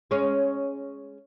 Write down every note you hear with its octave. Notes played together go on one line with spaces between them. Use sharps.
G#3 C#4